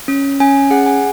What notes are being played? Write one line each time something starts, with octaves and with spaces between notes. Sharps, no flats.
C#4
C#4 G#5
G#4 F#5
G#5